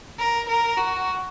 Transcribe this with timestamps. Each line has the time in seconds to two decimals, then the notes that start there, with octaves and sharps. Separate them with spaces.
0.19 A#4
0.49 A#4
0.78 F#4